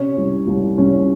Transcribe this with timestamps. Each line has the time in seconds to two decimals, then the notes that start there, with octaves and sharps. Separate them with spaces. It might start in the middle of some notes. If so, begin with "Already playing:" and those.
Already playing: C3 C#4 C#5
0.17 C2
0.47 C2
0.78 C2 C#4 C#5